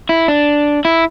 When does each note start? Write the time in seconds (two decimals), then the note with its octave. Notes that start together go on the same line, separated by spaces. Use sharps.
0.09 E4
0.28 D4
0.85 E4